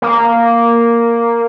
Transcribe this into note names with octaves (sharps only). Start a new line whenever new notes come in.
A#3